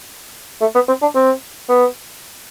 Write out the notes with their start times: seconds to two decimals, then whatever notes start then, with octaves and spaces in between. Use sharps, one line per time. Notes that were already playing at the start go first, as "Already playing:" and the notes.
0.61 A3
0.75 B3
0.88 C4
1.02 D4
1.15 C4
1.69 B3